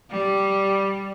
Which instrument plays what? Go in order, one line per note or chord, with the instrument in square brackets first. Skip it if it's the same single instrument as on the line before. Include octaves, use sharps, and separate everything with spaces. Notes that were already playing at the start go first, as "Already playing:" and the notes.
[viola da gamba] G3